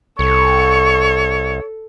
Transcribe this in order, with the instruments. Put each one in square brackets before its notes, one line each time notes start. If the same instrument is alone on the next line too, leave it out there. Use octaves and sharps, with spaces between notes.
[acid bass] C2 [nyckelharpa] A4 [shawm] C#5 [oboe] C#6